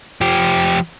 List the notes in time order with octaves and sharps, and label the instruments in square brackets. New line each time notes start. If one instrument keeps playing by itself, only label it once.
[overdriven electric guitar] F3 G4